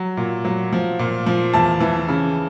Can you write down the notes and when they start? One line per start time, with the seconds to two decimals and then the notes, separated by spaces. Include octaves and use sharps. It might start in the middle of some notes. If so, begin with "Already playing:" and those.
Already playing: F#3
0.17 A#2
0.45 F#3
0.73 F3
0.99 A#2
1.26 F3
1.53 E2 A5
1.81 E3
2.08 C#3